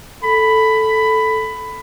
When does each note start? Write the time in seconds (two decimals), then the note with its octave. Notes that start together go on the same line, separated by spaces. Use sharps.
0.24 A4 B5